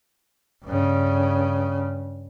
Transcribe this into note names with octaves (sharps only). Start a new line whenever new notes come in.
G2 C#3